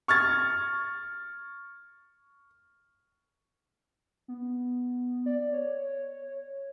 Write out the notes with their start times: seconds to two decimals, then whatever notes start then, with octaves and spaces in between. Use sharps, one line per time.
0.08 C#6 F6 G#6 A6
4.28 B3
5.26 D5
5.53 C#5